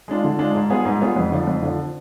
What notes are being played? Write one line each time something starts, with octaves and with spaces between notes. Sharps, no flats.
G#3 D4 F4
D3
G#3 D4 F4
G#2
G3 B3 F4 G#4
G#2
G3 B3 F4 G#4
F2
D3 F3
F2
D3 F3